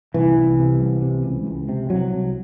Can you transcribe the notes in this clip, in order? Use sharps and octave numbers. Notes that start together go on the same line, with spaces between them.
C2 E3
C2
C3
C2
C3
C#2
C#2
C3
C2 F#3
C2